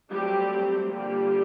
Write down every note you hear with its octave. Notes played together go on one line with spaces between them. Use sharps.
F#3 G3 A3 C4 G4
D3 F3 G3 A#3 G4